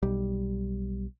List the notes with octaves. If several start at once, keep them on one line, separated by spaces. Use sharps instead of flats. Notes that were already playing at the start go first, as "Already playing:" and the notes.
B1 G3